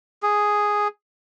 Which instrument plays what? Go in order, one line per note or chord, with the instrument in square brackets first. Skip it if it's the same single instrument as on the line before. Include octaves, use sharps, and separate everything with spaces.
[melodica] G#4